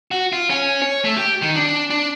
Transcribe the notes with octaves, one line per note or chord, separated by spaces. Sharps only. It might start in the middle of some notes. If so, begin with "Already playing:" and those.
F#4
F4
C#4
C#5
A3
G4
D#3
D4
D4